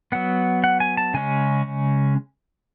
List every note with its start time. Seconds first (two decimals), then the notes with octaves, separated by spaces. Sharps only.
0.12 F#3 B3 F#5
0.64 F#5
0.80 G#5
0.97 A5
1.14 C#3 G#3 C#4 G#5